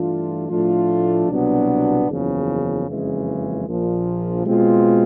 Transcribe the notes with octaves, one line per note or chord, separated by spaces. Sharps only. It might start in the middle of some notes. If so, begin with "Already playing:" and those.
Already playing: G2 E3 A3 D4 F4
A2 F3 A3 D4 F4
C2 B2 F#3 B3 D4
F#1 E2 C#3 F3
F#1 F2 C#3 E3 G#3
A#1 A#2 F3
B2 G#3 C4 F4